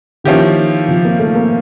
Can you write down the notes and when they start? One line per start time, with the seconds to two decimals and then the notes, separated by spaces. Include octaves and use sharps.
0.24 D#3 F3 A#3 C#4 E4 G4
0.88 F3
1.05 A#3
1.19 A3
1.36 A#3